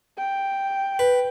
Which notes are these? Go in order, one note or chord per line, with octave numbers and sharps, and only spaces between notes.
G5
B4